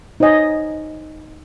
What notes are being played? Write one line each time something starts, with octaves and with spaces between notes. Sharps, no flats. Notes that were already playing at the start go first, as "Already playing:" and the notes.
D#4 C5 C#5 D#5 G#5